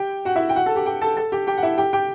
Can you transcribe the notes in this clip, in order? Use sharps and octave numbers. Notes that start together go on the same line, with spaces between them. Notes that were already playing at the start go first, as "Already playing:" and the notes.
Already playing: G4 G5
F#4 F#5
E4 E5
G5
F#4 F#5
A4 A5
G4 G5
G4 G5
A4 A5
A4 A5
G4 G5
G4 G5
F#5
E4 E5
G4 G5
G4 G5